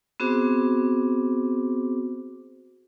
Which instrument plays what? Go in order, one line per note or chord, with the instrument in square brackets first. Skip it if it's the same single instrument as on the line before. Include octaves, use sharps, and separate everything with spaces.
[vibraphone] B3 C4 F#4 G#4 C5 D6